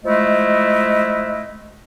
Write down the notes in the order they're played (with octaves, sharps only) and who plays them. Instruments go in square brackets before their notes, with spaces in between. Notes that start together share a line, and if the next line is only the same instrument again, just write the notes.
[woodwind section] F3 G#3 A3 E4 D#5